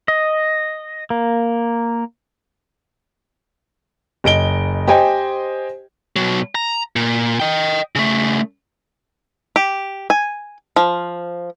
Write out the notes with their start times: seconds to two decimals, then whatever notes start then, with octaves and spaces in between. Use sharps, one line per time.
0.08 D#5
1.10 A#3
4.24 F#1 D#5 D7 G7
4.88 G4 C5 D#5 G5 G#5
6.16 B2 F#3
6.55 A#5
6.96 A#2
7.40 D#5 G5
7.95 C#3 A3
9.56 G4
10.10 G#5
10.76 F3